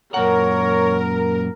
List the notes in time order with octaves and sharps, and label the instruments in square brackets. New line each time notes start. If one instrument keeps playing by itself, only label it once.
[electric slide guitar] F#2 A#2 F#5 [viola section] A#4 [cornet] C#5